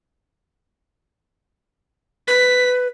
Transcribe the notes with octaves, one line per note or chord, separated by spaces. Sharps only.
B4 B6